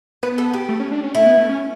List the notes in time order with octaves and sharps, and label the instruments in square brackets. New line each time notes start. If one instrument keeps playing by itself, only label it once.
[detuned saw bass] B3 [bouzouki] B4
[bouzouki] A4
G4
[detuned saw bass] A3
C#4
D4
C#4
[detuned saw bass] A3 [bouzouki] E4
[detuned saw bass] B3
A3
C#4